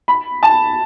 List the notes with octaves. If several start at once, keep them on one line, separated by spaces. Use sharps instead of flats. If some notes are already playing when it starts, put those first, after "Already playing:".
B5
A5